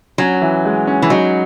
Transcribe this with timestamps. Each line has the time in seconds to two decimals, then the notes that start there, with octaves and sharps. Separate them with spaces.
0.18 F#3 C#4
0.42 E3
0.65 G#3
0.87 C#4
1.02 E3
1.10 F#3 D#4